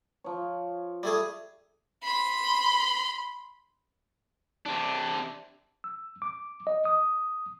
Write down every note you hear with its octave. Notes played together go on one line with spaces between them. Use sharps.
F3 C#5
G3 A3 G#4
B5 C6
C3 D4
E6
D6
D#5
D#6